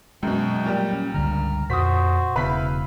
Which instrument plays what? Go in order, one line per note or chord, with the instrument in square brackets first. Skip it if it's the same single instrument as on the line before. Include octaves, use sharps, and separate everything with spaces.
[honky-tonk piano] F#2 B2 [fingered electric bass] F#3 G#3 [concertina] G5
[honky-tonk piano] A#2 G3
[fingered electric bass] C#4
[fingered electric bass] C#2 G2 D3 [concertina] A#5 F6
[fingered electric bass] F2 A#2 [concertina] F#4 C5 [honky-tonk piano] D#6 B6
[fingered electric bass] E1 C#3 B3 [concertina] E4 F5 [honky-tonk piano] B4 B6